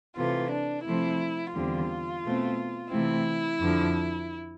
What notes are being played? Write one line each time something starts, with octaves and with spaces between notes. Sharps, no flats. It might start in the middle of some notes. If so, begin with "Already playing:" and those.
C3 E3 A3 F4
D4
C3 F3 A3 C4 E4
E2 D3 G3 C4 F4
B2 A3 C4
C3 E3 A3 C4 E4
F2 D3 F3